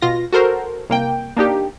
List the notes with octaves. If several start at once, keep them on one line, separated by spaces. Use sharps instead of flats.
B2 F4 A#6
F#4 A4 A#4 C5
C2 A#3 G5
A#3 D4 D#4 G4